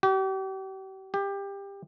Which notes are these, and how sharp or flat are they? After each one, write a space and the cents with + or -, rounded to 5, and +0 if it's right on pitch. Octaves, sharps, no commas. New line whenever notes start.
G4 -40
G4 +20